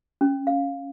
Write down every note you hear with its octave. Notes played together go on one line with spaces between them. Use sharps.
C#4
F5